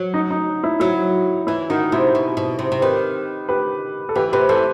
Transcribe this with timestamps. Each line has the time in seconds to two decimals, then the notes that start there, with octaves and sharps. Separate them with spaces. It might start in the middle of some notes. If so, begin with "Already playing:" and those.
Already playing: F#3
0.14 D#4
0.31 D#4
0.64 E4
0.80 F#3 E4
1.47 E3 E4
1.70 D#3 D#4 F#4
1.92 C3 E4 G4
2.15 B2
2.37 B2
2.59 C3
2.72 C3
2.81 D#3 G4 B4
3.49 G4 B4
4.09 A4
4.16 E3 G4 B4
4.33 C3 G4 B4
4.49 E3 A4 C5